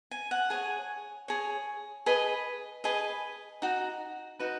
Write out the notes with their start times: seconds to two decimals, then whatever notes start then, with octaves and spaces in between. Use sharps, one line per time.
0.11 G#5
0.31 F#5
0.50 G#4 C#5 G#5
1.28 G#4 C#5
2.06 G#4 B4 D#5
2.84 G#4 B4 D#5
3.62 D#4 F#4
4.39 D#4 F#4 B4